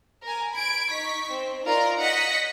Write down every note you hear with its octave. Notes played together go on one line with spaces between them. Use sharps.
A#4 G#5
B5 G#6 D7
D#4 C#6 B6
C4
D#4 F4 A#4 D5 A#5
C#5 D#5 F#5 A#6 B6 C#7